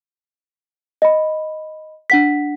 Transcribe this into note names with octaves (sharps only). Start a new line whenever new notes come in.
D#5 B5
D4 F#5 B6